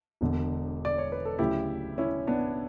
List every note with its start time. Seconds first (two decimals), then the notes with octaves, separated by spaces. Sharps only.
0.21 E1 E2 D3
0.85 D5
0.98 C#5
1.12 B4
1.25 A4
1.39 D2 C#3 F#3 E4 G4
1.98 C#4 E4
2.27 B3 D4